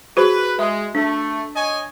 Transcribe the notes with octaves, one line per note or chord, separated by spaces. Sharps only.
F#4 G#4 B4 C5
G#3 E5
A3 D4
C#5 D#5 G#5